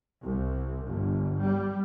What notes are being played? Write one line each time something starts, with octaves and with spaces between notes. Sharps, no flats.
C2
G1
G3